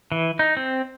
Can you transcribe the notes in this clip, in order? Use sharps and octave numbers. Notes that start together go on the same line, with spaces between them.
E3
D#4
C4